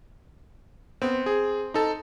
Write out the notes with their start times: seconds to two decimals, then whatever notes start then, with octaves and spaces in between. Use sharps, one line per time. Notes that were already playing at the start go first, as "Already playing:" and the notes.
1.02 B3 C4
1.26 G#4
1.74 D#4 A4 A5